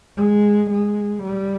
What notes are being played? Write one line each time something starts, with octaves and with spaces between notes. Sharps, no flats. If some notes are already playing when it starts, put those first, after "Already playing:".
G#3
G#3
G3